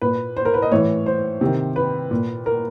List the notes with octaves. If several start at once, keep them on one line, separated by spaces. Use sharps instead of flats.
A#2 B4
C5
A#4
B4
D#5
A2 E3 C#5
C5
C3 D#3
B4
A#2
A#4